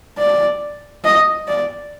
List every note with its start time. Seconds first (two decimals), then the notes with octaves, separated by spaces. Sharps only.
0.18 D5
1.04 D#5
1.47 D5